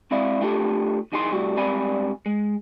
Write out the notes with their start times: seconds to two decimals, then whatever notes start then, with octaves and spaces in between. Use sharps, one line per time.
0.11 G#3 C4 E4 D5 F5
0.41 A3 D4 F4 G4 A4
1.12 B1 E3 D#4 G#4 B4 C6
1.32 A2 C3 G3 F#4 G4
1.57 G#2 G3 C4 D5 G#5 B5
2.26 G#3